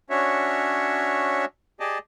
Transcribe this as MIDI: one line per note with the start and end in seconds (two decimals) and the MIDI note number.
0.10 1.45 61
0.10 1.45 62
0.10 1.45 66
0.10 1.45 73
0.10 1.45 76
1.80 1.98 67
1.80 1.98 68
1.80 1.98 74
1.80 1.98 75
1.80 1.98 81